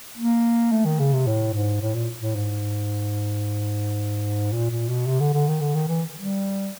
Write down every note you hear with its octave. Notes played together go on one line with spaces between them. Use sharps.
A#3
A3
D#3
C#3
C3
A2
G#2
A2
A#2
A2
G#2
A#2
A#2
B2
C3
D3
D3
D#3
D3
D#3
E3
G3